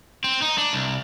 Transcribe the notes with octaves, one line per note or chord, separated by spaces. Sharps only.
C4
D#4
D4
C2